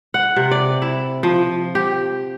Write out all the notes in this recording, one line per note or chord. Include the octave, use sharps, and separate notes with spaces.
F#5
C3
D5
E4
F3
G4